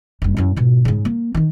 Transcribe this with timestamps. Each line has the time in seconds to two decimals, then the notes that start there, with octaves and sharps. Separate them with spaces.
0.22 F#1 G2
0.37 F#2 E4
0.56 G#2 B2
0.85 G#2 C#3
1.05 A#3
1.35 D#3 D#4